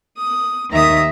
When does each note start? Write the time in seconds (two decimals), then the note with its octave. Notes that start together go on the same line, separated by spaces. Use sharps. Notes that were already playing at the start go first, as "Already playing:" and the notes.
0.17 D#6
0.71 D#2 D#3 E5 A#5 D#6